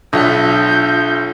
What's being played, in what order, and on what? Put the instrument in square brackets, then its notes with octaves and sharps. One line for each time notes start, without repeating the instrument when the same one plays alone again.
[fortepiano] B1 [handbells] D4 E5 F#6 [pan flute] F4 [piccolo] G6